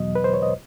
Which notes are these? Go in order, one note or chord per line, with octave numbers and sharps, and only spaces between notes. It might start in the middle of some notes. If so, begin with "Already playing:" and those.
Already playing: E2 B2 F#3 D#5
B4
C5
C#5
D#5